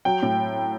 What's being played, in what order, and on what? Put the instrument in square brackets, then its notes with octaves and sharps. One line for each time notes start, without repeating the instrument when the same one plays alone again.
[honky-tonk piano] F#3 G5
A2